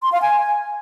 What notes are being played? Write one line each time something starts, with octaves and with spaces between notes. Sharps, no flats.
C6
F5
G#5